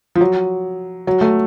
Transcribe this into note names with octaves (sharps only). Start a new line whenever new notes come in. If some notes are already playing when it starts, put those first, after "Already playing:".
F3
F#3
F#3
A3